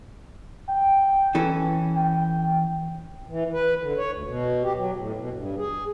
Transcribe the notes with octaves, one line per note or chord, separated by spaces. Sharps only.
G5
E3 C#4 A4
G5
E3
B4
D3
C#5
D2
B2
G4
F#3
A2
B2
G2
G#4